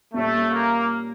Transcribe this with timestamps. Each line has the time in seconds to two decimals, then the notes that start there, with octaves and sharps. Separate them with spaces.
0.14 A#2 G3 A3 C#4
0.51 A#3